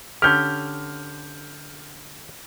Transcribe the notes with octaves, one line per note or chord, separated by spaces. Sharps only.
D3 C#4 G4 F6 G6